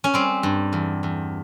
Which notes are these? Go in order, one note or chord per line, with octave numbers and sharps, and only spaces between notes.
C#4
G3 C4
G2
E2
E2